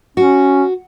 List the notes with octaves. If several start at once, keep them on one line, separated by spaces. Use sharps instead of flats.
C#4 F#4